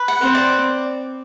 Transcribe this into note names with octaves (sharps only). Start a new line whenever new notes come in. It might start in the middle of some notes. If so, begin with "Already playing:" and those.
Already playing: B4
F#5
C4
D5